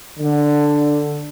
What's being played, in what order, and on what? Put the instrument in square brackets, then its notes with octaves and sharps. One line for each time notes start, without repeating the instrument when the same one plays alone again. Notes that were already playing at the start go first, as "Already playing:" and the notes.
[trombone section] D3